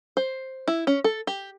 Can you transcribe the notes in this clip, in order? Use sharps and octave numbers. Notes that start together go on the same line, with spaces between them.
C5
E4
C#4
A4
G4